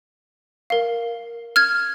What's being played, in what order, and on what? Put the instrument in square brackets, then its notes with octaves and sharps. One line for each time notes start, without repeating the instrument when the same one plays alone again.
[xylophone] A#4 F5
F6 G#6